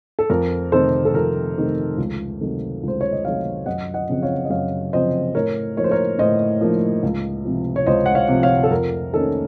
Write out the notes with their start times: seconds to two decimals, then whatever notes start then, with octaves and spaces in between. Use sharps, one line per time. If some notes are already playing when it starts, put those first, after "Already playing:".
0.19 A4
0.30 F2 A#4
0.72 C3 D#3 A3 A4 C5
1.05 A4
1.14 F2 A#4
1.56 C3 D#3 A3
1.98 C#2
2.40 C3 D#3 F#3 A3
2.83 C#2 C5
3.01 C#5
3.12 D#5
3.24 C3 D#3 F#3 A3 C#5 F5
3.66 F#2 D#5 F#5
3.94 D#5 F#5
4.09 C#3 F3 C4
4.23 C#5 F5
4.45 D#5
4.50 F#2 C#5 F5
4.93 C#3 F3 C4 C5 D#5
5.34 A2 A#4 C#5
5.77 F3 A#3 D#4 C#5
5.84 C5
5.91 A#4 C#5
6.18 A2 C5 D#5
6.61 F3 A#3 D#4
7.03 C#2
7.45 C3 F3
7.76 C#5
7.86 C#2 C5 D#5
8.06 F#5
8.15 C#5 F5
8.28 C3 F3
8.43 C#5 F5
8.63 A4
8.71 F2 A#4
9.13 D#3 A#3 C#4 A4